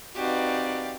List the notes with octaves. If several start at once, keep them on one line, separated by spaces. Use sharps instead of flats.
C4 D#4 F#4 G4 B4 D5 F5